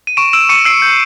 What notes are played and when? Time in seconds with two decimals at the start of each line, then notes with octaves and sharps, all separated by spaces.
0.07 D#7
0.17 C#6 D7 E7
0.33 E6 D7 E7
0.49 C#6 C#7 D#7
0.65 E6 C7 D7
0.82 G6